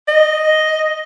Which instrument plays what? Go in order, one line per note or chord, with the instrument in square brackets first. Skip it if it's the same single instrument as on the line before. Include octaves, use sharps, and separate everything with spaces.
[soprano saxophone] D#5